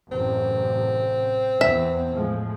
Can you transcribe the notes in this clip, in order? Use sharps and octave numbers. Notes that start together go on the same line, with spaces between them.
A1 F#2 C3 C4
E2 E5
A2 F3 G#3